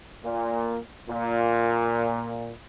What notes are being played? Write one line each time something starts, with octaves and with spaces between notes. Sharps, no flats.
A#2
A#2